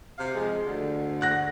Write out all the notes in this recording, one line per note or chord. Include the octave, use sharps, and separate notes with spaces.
C3 F5
F3 G#3
D2 D3
F#5 F#6 A#6